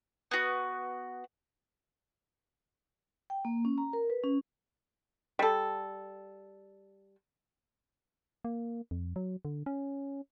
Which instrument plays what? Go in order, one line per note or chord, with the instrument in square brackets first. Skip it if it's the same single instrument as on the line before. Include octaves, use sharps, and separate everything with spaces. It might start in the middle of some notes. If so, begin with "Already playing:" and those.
[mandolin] B3 F#4
[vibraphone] G5
A#3
C#4
A#5
A#4
B4
C#4
[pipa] G3 A4
[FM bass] A#3
F2
F#3
D3
C#4